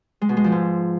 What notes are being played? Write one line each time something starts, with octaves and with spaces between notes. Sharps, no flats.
G#3
B2
G#3
F3
G#2